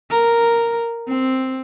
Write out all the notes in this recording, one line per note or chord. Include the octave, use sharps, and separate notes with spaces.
A#4
C4